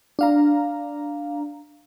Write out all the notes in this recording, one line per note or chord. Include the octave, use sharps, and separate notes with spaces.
D4 F5 A#5